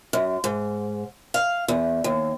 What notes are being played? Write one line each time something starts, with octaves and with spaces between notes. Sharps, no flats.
F#2
G#2
F5
E2
D#2